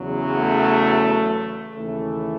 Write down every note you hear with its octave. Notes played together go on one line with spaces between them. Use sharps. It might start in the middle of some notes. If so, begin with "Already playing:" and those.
Already playing: E2 C#3 F#3
A3
D#2 C#3 E3 A3